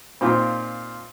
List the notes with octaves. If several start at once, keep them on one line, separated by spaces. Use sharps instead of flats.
A#2 C4 D#4 F4